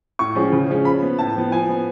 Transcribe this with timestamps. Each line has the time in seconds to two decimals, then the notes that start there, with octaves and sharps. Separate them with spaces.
0.19 A2 C#6
0.35 F3 G#3 C#4
0.52 C#3
0.68 F3 G#3 C#4
0.85 F3 B5
1.02 B3
1.19 A2 A5
1.36 F3 B3
1.52 F3 G#5
1.69 B3